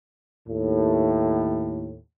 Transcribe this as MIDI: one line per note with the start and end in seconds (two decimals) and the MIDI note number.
0.48 1.97 39
0.48 1.97 45